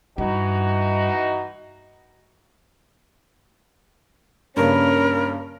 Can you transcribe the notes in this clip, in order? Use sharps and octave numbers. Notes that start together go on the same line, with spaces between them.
G2 E3 D#4 F#4
G2 C#3 A#3 C#4 A#4 B5